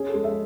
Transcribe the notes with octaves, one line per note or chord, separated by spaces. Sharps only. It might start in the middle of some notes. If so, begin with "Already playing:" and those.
Already playing: C#4 G#4
A4
G#3
E5